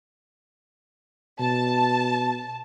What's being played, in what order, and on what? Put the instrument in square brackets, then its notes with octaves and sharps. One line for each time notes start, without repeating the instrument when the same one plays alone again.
[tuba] B2 [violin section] A5